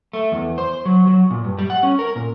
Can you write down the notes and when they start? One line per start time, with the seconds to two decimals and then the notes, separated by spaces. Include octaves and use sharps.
0.13 A3
0.32 E2
0.58 C5
0.86 F#3
1.07 F#3
1.31 A#2
1.45 G2
1.59 G3
1.70 F#5
1.83 C#4
1.99 A#4
2.16 A#2